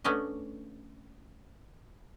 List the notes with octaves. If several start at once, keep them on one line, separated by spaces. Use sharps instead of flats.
A3 B3 C#4 D4 D#5